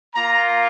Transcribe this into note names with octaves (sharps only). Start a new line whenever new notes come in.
A#3 F4 A#5